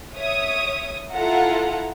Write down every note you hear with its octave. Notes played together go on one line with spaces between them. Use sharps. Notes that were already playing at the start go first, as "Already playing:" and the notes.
C#5 E5 D#6
E4 F4 A4 E5 F#5 A#5